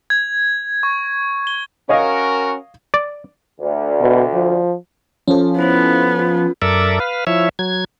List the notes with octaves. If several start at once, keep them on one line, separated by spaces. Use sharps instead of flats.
G#6
C#6
G7
C#4 F#4 A#4 C#5 D#5 F5
D5
D2
B2
F3
F3 C#4 A4
B3 E4 B4 C5
F4
F#2 A4 A#4 D5 E5
B4 F5
F3 E4 C#5 E5
F#3 G#6